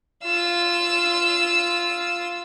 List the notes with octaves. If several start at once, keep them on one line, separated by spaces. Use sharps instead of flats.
F4 E6